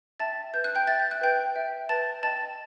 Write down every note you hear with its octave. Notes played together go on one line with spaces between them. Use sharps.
E5 G5 A5 A6
B4 G6
F#6
G5 G6
E5 G5 A6
G6
F#6
B4 G5 G6
E5 G5
B4 A5 A6
D#5 G5 A5 A6